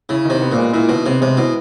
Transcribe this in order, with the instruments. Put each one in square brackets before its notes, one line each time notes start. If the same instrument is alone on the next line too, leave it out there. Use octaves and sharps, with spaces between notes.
[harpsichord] C#3 [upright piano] E4
[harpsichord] C3 [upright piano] D#3
[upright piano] B3
[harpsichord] A#2
[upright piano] G#3
[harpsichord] A#2 [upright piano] E4
[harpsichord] B2 [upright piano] D#3
[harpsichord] C3 [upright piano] B3
[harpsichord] C3 [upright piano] G#3
[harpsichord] B2 [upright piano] E4